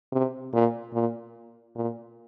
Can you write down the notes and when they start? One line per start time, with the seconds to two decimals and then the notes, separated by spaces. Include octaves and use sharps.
0.12 C3
0.53 A#2
0.94 A#2
1.75 A#2